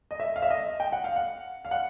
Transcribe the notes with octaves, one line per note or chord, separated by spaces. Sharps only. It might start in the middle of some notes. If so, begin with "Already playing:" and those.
D#5
E5
F5
E5
D#5
G5
F#5
F5
F#5
F5
F#5